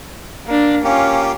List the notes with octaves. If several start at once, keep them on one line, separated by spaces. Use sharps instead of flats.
A#3 D4
A#3 C#4 F4 G4